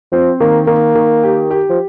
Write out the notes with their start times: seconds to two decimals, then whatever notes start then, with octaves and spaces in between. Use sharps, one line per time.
0.12 F3 C4
0.40 D#3 A#3
0.67 D#3 A#3
0.95 D#3
1.23 G4
1.51 G4
1.70 F3